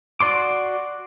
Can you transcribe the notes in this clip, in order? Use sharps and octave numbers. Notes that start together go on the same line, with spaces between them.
F#4 D5 C6 D6